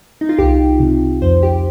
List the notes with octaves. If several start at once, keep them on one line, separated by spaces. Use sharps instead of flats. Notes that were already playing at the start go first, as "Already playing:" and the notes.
D#4
F4
C2 G4
C3
F2 C5
G4